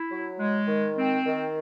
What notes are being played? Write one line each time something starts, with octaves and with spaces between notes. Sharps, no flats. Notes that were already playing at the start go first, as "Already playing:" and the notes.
Already playing: E4
F#3
G#3
D#3
C4
D#3